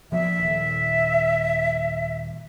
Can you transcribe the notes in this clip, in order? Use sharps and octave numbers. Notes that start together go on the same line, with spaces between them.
F3 A#3 B3 E5
D#1